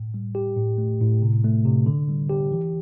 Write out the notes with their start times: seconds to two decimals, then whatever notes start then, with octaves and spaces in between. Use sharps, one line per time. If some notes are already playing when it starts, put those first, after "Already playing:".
Already playing: A2
0.14 G3
0.35 G4
0.57 A2
0.78 A3
1.01 A2
1.22 C3
1.44 A3
1.66 C3
1.86 D3
2.09 G3
2.30 G4
2.52 E3